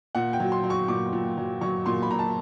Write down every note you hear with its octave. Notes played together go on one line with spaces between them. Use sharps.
A#2 F#5
G5
F#3
C6
F#3
C#6
A#2 D6
A#2
F#3
F#3 C#6
A#2 C6
B5
A#2 A#5
A5